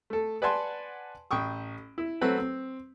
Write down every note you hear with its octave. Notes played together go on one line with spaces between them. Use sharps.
A3 A4
B4 D5 F#5 G#5 A5 C6
A1 G5 C#6 D#6
E4
F#3 A3 C4 F#4 A4 B4
C4